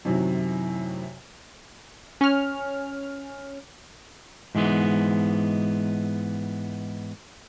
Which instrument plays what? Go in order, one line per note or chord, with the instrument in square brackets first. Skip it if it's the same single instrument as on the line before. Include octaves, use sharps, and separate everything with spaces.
[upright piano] F#2 A2 C3 D#3 F#3
[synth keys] C#4 F6
[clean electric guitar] G#2 E3 G#3 B3